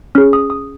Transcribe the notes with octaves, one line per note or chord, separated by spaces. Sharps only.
C#4 G#4 F6
D#6
D#6